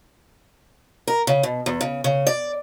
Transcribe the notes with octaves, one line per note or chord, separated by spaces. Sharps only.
A#4
C#3
B2
E2
C#3
C#3
D5